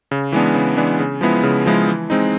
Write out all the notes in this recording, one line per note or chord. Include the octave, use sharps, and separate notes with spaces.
C#3
E3 G#3 B3 D4
C#3
E3 G#3 B3 D4
C#3
F3 G#3 B3 E4
C#3
F3 G#3 B3 E4
E3
G#3 C4 D#4